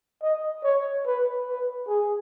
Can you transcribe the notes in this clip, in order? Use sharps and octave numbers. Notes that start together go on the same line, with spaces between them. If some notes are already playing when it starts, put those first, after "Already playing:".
D#5
C#5
B4
B4
G#4